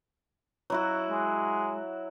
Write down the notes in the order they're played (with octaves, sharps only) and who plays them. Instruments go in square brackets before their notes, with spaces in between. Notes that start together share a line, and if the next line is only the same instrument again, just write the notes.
[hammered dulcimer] F#3 E4 F#4
[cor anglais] G#3